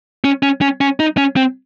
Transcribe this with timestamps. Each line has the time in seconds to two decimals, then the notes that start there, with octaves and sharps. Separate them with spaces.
0.24 C#4
0.43 C#4
0.61 C#4
0.81 C#4
1.00 D#4
1.17 C#4
1.36 C4